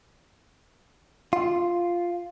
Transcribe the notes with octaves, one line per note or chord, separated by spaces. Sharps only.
F4